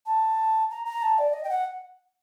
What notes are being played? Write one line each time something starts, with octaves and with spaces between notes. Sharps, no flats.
A5
A#5
A#5
A5
D5
D#5
G5
F#5